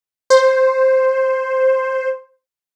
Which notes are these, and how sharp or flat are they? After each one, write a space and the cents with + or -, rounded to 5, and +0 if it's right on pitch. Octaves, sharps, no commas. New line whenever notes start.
C5 +5